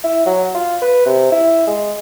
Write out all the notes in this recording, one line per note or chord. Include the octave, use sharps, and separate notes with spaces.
E4
F#3
F4
B4
C3
E4
G#3